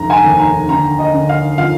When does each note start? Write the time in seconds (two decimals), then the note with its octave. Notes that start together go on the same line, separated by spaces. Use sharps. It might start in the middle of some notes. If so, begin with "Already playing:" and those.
Already playing: F1 D3 A#5
0.10 G#5
0.24 D#2
0.39 A#5
0.68 D3 A#5
0.99 D#5
1.13 D3
1.29 F5
1.58 F3 F5